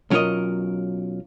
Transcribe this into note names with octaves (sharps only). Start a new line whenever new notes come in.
B1 F#3 C#4 F4 A#4 D#5